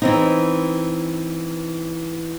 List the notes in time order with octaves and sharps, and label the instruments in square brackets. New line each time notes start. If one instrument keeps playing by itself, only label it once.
[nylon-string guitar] E3 C4 D#4